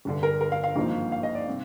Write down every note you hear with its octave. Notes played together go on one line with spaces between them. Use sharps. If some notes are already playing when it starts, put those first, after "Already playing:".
G1 G2 D3
A#4
A#4
F5
F5
G#1 G2 F3 A#3 D#4
F5
D#5
D5
C3 G3